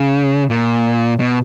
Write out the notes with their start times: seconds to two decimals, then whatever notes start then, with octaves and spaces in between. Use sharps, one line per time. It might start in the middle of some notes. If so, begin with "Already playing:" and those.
Already playing: C#3
0.50 A#2
1.20 B2